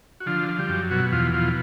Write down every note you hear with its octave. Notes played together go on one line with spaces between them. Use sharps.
F#4
D3 F3 F4
F3
G3 G4
F#2
B2 F#3 F#4
E2 F3 F4
B2 F3 F4